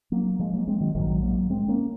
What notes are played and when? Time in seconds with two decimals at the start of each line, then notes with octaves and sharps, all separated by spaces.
0.12 F#3 A#3
0.39 F3 G#3
0.53 F#3 A#3
0.67 G#3 C4
0.81 D#3 F#3
0.95 A#1 G#2 D#3 F#3
1.23 F#3 A#3
1.50 G#3 C4
1.68 A#3 C#4